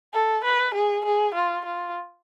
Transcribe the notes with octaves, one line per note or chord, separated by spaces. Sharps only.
A4
B4
G#4
G#4
F4
F4